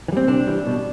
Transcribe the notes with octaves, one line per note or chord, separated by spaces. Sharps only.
E3
G3 C4
C3 D4
E3 G3
B2